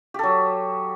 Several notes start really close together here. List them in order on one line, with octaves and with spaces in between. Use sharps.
G4 A4 F#3